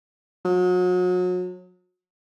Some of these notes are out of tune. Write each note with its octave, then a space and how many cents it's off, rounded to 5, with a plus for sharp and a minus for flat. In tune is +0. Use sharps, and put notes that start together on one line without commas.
F#3 -35